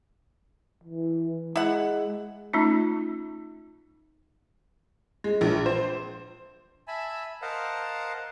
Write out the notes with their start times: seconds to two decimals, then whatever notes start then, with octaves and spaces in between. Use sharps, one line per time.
0.84 E3
1.56 G#3 E4 F#5
2.53 A3 C#4 D#4 F4
5.24 G#3
5.41 A#1
5.66 C5
6.88 E5 G#5 A5 B5
7.42 A#4 C5 D#5 F5 F#5 A5